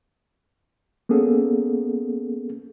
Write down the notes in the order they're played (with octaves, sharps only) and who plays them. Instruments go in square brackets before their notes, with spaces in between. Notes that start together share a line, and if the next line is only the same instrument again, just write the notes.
[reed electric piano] A#3 B3 C#4 G#4 A4